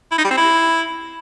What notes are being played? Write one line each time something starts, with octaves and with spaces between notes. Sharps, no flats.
E4
D#4
G3
C4
E4